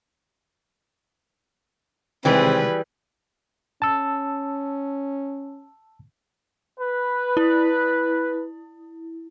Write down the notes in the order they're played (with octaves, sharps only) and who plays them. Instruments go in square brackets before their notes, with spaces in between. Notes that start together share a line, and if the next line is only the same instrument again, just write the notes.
[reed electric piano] C3 D#3 G#3 [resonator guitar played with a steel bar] E3 G3 G#4 [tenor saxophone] C4 [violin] B4
[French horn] C#4 [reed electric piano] A5 E6
[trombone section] B4
[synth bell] E4